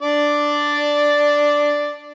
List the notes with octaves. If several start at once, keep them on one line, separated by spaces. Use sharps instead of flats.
D4 D5